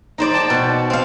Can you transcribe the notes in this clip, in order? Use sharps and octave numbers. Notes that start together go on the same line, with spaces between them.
D#4 C5 D5
D5 G5 A5
B2
C4 F5